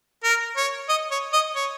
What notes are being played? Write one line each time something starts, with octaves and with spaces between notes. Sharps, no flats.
A#4
C#5
D#5
C#5
D#5
C#5